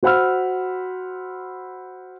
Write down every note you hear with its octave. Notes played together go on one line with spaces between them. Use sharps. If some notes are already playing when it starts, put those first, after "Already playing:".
F#4 C5 F#5 B5 E6 F6